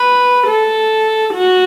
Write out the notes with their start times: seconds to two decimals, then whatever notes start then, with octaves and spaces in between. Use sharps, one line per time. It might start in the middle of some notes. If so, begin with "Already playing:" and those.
Already playing: B4
0.47 A4
1.34 F#4